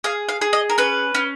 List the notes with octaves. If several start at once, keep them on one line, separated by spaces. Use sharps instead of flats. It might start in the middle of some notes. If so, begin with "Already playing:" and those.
G#4 F5
F5
G#4
D#5
A#4
C#4 B4
C#4